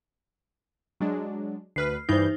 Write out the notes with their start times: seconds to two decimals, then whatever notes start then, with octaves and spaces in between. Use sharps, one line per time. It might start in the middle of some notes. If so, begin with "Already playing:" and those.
1.00 F#3 G#3 D4
1.76 D2 B4 F6 C7
2.09 G2 E3 D#4 C5 G6